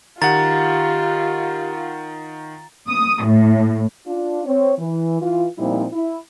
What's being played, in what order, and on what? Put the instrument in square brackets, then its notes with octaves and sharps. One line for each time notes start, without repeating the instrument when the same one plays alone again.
[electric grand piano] D#3 F#5 [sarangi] F4 [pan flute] G4 [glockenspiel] A#5 A6
[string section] D#6
A2
[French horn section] D4 F4
C4 C#5
E3
E3 F4
A#2 F3 G3 C4 D#4 E4
E4